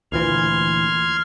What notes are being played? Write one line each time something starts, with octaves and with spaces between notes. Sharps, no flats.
D2 A#2 E3 C6 F6 G#6